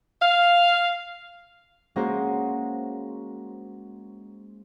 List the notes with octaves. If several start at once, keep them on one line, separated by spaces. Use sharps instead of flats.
F5
G#3 A#3 C#4 F#4 A#4 C5